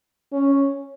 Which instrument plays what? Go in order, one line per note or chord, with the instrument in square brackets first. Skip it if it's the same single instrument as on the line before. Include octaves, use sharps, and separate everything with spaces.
[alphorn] C#4